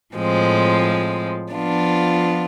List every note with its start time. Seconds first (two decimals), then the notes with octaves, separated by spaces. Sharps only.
0.15 A2 F3 G#3 C4
1.52 F3 B3 D4 F4